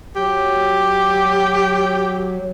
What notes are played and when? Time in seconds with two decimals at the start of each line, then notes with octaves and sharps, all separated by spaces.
0.16 F#3 G4